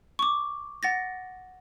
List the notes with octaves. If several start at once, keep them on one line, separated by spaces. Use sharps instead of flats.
C#6 D6
F#5 A6 A#6